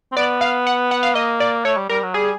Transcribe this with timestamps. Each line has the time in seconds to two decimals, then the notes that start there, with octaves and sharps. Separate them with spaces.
0.12 C4
0.16 B3 D5
0.41 F5
0.67 F#5
0.91 F#5
1.03 F5
1.15 A#3 D#5
1.40 D5
1.65 A3 C#5
1.77 G3
1.89 G3 A#4
2.03 F#3
2.14 G3 G#4